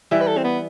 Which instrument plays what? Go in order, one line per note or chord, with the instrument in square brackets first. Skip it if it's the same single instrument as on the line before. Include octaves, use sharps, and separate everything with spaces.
[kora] E3 G3 [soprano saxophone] E5
[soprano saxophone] B4
A4
C4
B3